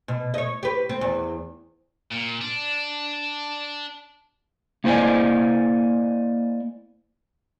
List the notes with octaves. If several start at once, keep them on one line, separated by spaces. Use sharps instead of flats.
B2
C#5 D#5
G4 B4
C4
E2
A#2
D4
A#3 E4 C5 D5 D#5 G#5